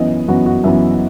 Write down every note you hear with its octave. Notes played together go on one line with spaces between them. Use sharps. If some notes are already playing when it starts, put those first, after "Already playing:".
Already playing: F#2 E3 B3 D#5
F#2 E3 B3 F#4
F#4
F#2 E3 B3 E5